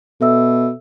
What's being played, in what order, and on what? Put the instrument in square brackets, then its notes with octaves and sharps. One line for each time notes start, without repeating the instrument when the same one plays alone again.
[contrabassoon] B2 [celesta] A4 E5 E6